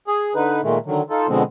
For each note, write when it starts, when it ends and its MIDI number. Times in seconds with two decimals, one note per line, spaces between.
0.07 0.34 68
0.35 0.61 50
0.35 0.61 63
0.35 0.61 71
0.63 0.78 46
0.63 0.78 51
0.63 0.78 56
0.63 0.78 57
0.86 1.02 50
0.86 1.02 51
0.86 1.02 54
1.10 1.27 63
1.10 1.27 65
1.10 1.27 69
1.28 1.43 47
1.28 1.43 50
1.28 1.43 53
1.28 1.43 56
1.28 1.43 59
1.28 1.43 60